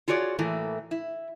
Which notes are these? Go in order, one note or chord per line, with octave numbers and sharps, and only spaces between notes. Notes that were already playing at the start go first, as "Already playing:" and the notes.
F4 F#4 G#4 C#5 D5
A2 E3 A3 A#3
E4